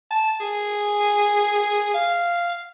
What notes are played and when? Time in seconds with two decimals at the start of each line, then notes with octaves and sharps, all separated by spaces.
0.11 A5
0.40 G#4
1.94 F5